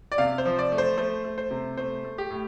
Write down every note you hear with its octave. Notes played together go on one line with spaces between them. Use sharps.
D5
C3 F5
C5
F3
D5
A3
C5
A3 C5
A3
C5
C3
A3 C5
A3
G4
A2